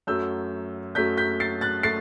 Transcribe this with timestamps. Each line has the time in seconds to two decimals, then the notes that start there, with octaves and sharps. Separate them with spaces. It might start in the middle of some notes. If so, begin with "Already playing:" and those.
0.07 F#2 F#3 A3 E6 G6
0.95 F#2 F#3 A3 G6 B6
1.17 G6 B6
1.40 A6 C7
1.61 F#6 A6
1.83 A3 A6 C7